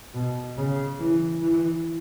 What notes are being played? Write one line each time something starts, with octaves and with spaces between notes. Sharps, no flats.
B2
C#3
E3
E3